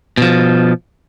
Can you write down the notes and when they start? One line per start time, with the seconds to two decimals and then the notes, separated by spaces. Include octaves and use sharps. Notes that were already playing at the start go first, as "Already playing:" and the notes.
0.18 B2 F3